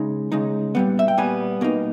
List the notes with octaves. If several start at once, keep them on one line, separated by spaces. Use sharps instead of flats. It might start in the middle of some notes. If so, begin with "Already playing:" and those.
Already playing: C#3 G#3 D#4
C#3 G#3 D#4
A#2 G3 B3
E5
G5
A#2 G3 B3 G#5
B2 A#3 D#4